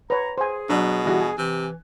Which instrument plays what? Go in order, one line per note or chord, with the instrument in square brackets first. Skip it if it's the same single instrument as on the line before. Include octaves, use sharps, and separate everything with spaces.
[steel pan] B4 C#5 [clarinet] A#5
[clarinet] G#4 [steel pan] C5 G#5
[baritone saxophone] B2 [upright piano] F#3 [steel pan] D4
[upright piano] E3 G3 F#4
G#5
[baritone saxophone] C3 [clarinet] E3